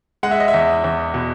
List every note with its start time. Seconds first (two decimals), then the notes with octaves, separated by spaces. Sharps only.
0.23 G#3 F#5
0.31 E5
0.40 D#5
0.48 E5
0.54 E2
0.84 E2
1.14 B2